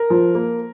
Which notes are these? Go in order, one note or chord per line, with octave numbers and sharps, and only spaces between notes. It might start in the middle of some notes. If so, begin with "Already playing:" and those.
Already playing: A#4
F3
A#3